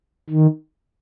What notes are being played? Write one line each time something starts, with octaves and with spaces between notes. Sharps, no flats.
D#3